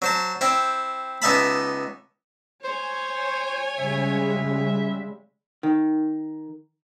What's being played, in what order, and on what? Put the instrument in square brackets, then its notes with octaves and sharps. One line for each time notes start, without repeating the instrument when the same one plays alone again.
[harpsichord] F#3 C5 A5
C4 E4 G5
C#2 B3 D#4 E5 A5 B5
[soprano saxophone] C5 [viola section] C#5 G#5
[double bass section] C#3 G3 G#3 [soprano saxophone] E5
[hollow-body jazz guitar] D#3